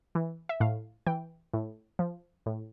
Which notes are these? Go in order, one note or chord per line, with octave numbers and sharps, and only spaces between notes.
E3
E5
A2 F5
E3 G5
A2
F3
A2